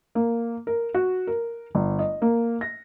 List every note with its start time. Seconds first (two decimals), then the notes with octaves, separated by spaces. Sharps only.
0.15 A#3
0.67 A#4
0.94 F#4
1.27 A#4
1.75 G1
1.99 D#5
2.22 A#3
2.61 A#6